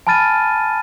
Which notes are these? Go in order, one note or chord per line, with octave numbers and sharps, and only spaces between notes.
G#5 A5 B5 F6 A6 D#7